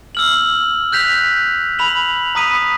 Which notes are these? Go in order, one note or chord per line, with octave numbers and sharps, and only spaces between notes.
E6 F6 F#7
F#6 G6 B6 F7
B5 F7 F#7
A#5 B5 D#6 B6 D#7